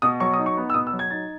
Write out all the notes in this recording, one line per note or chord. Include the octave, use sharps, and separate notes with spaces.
B2 D#6
F#3 C#6
D#6
D#4
C#6
B3
E6
B2 D#6
E6
F#3
G#6
D#4 A6